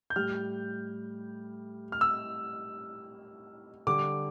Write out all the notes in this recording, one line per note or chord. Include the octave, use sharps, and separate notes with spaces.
G6
A2 G3 F6
F6
E6
D3 G3 D6